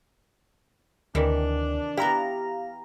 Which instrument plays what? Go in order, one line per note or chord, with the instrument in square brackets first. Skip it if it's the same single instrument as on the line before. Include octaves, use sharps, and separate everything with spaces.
[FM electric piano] D2 [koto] C3 D#3 E3 [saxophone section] D4
[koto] B3 E4 [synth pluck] G4 A#5 [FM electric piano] F5